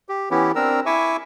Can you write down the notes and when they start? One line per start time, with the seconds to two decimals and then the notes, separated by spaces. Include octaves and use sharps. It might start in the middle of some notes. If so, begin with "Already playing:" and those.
0.09 G4
0.31 E3 B3 C#4 E4 G4
0.55 C4 D4 A#4 A#5 E6
0.86 E4 E5 G#5 C#6 D6 E6